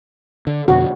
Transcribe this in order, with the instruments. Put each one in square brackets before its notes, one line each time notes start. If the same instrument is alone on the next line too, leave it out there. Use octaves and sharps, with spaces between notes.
[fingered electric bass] D3
[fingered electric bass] F2 B2 D3 [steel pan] F#4